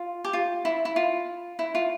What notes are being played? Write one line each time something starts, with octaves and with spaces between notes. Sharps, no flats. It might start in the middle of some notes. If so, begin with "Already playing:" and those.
Already playing: F4
G4
F4
E4
E4
F4
E4
F4